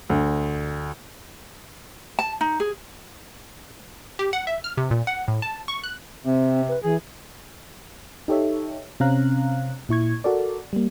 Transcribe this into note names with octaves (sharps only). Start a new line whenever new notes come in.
D2
A5
D#4
G#4
G4
F#5
E5
F6
C3
A#2
F#5
A2
A5
C#6
F#6
C3 C4
B4
E3 G#4
D#4 G4 A4 C#5 E5
C3 C4 C#4 F5 A#5 F#6
A#2 E4 C#6 G#6
F#4 A4 A#4 D5
G3 A#3